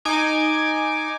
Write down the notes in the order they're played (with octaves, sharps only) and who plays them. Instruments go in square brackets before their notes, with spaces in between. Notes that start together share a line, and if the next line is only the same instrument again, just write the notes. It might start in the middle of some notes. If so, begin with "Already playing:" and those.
[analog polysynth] D#4 G#5 D6